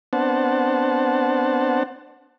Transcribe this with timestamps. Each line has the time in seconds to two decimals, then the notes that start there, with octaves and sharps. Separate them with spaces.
0.13 B3 C4 D4 C5 F#5 A5